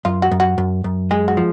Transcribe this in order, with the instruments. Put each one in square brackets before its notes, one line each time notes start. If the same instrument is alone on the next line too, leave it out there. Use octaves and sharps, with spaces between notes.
[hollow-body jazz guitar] F#2 [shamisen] F4
[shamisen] F#4
[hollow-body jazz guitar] F#2
[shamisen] F#4
[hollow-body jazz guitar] F#2
F#2
[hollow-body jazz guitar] G#3 [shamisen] G#4
[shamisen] F#4
[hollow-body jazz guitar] F3